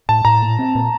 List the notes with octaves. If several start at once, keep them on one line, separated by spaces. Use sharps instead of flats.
A2 A5
A2 A#5
A#2
C4
A#2